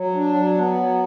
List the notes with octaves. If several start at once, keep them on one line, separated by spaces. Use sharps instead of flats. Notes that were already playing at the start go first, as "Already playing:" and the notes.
Already playing: F#3
D4
F#3
B3
F#3